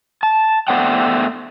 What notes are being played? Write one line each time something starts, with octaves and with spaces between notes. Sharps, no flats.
A5
A3 B3 C5 D5 F#5 G5